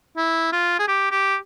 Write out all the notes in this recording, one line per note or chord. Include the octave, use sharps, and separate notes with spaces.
E4
F4
G#4
G4
G4